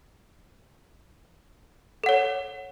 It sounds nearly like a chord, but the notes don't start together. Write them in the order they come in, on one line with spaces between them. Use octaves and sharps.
A4 F#5 C#5